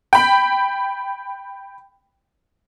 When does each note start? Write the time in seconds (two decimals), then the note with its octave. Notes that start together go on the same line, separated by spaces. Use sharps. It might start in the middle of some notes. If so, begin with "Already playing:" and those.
0.13 G5 B5